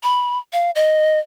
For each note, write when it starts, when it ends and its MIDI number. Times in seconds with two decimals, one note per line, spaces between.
0.03 0.38 83
0.53 0.71 77
0.75 1.19 75